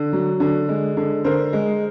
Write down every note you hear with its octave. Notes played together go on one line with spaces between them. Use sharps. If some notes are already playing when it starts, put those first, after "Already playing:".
Already playing: D3
F#3
D3
G#3
D3
D3 A#4 C5
G#3